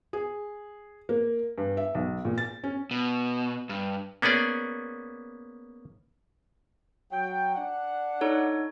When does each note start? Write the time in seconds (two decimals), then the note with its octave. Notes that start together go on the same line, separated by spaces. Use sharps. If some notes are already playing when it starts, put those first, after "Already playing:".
0.13 G#4
1.09 A#3
1.58 G2
1.77 E5
1.95 B1
2.25 A#2
2.38 A6
2.64 C#4
2.91 B2
3.69 G2
4.22 A#3 B3 C#4 G#4 D5
7.12 F#3 G5
7.56 D4 F#5
8.21 D#4 A4 C#5